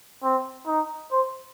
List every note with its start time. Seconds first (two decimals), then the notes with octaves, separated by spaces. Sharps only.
0.24 C4
0.67 D#4
1.12 C5